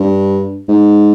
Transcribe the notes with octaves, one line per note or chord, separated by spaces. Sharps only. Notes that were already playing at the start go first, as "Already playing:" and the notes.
Already playing: G2
G#2